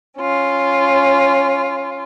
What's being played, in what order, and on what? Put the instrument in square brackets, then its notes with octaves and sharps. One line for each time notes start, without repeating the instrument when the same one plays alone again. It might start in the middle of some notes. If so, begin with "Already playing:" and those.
[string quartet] C#4 F4